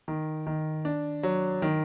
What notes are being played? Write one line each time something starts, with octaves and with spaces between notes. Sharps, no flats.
D#3
D#3
D4
F#3
D#3